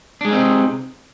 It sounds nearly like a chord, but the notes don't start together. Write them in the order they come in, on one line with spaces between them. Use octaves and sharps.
D4 G#3 D#4 C4 C3